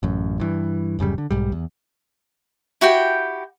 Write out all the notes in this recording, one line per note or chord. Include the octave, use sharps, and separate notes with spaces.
A1 F#2
G2 E3
D1 F#2 C#3 G3
D3
B1 G#2 G3
E2
E4 F#4 G4 G5